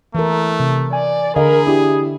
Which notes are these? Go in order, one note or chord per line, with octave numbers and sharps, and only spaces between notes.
E3 A3 A#4
C3
D5 G#5
D3 G#4 A#4 D#5 F5 B5
D4 E4 G4 D#6